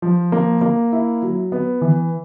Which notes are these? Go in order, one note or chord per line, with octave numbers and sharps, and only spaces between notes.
F3
A#3
A#3
E4
F#3
B3
E3